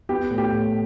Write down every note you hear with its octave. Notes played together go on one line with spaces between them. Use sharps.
B3 G4
A2
G4
A2